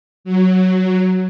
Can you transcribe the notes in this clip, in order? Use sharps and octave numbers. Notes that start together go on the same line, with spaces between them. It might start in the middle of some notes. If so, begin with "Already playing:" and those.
F#3